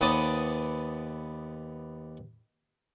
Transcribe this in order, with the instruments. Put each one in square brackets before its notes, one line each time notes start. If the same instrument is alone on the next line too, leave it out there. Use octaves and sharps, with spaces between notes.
[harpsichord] D#2 B3 C5 D5 D#6